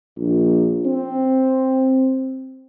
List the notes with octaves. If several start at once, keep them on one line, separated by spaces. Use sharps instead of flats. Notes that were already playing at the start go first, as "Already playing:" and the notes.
A#1
C4